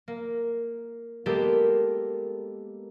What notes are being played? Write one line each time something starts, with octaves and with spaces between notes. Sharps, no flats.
A#3
G#3 A#3 B3 G4 A4 A#4